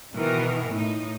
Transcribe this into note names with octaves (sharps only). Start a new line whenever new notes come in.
B2 D#3 E3 A#4
A2 D#4